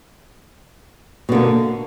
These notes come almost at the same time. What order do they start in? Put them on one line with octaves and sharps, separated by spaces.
B2 D3 A#3